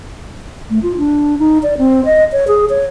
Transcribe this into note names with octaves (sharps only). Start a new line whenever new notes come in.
A3
F4
D4
D#4
D5
C4
D#5
C#5
G#4
C#5